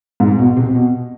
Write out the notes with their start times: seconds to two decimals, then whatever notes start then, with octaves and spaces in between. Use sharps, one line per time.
0.20 G#2
0.39 B2
0.57 C3
0.75 B2